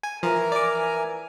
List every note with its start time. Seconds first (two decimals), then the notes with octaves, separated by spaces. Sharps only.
0.03 G#5
0.23 E3 F3 A#4 G#5 A#5
0.52 D5 D6